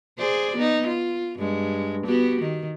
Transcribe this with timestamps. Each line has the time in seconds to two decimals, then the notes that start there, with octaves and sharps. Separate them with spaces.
0.18 G#4 C5 D5
0.56 B3 D#4
0.88 F4
1.38 G2 G#3
2.06 B3 F#4 G4
2.41 D#3